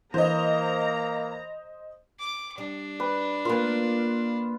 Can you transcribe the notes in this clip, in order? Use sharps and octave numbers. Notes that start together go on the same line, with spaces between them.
E3 A#3 C5 D#5 A#5
D6
G3 D4
B4 D6
A#3 F4 A#4 B4